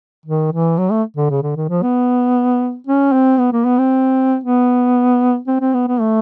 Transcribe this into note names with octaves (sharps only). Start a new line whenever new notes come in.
D#3
E3
F#3
A3
D3
C#3
D3
D#3
F3
B3
C#4
C4
B3
A#3
B3
C4
B3
C4
C4
B3
B3
A3